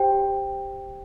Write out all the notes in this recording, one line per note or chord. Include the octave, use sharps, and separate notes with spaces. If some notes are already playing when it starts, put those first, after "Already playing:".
Already playing: G4 C5 G5